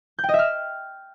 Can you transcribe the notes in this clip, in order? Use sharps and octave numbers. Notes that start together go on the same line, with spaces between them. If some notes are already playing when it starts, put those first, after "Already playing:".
G6
G5
D#5
E5
F6